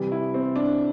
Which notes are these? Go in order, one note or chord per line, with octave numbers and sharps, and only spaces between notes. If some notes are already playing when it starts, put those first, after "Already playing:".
Already playing: C3 E3 G3
E4
C4
D4